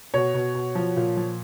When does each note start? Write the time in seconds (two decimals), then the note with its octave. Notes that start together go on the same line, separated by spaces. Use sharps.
0.14 B2 C#5
0.34 B2
0.55 B2
0.75 F3
0.96 A#2
1.17 F3